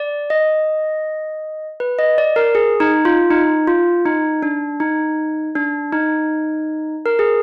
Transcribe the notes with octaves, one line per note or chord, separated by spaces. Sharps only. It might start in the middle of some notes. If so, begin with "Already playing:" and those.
Already playing: D5
D#5
B4
D#5
D5
A#4
G#4
D#4
F4
D#4
F4
D#4
D4
D#4
D4
D#4
A#4
G#4